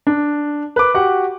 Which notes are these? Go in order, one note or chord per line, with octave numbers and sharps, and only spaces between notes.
D4
B4 D6
F#4 G4 F#5